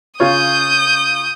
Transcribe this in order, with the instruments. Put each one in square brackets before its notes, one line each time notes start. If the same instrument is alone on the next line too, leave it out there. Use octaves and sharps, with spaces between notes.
[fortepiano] C#3 F4 C#5 [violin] D#6 G6